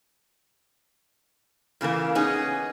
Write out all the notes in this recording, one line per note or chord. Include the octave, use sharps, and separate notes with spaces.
A#2 C#3 E3 A#3
B3 C#4 D#4 G#4